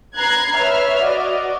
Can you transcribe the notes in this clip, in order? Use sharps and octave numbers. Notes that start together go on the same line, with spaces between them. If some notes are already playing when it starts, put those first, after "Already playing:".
B4 A#5 F#6 G#6 C7
B4 C#5 E5 F6
F#4 D5 D#5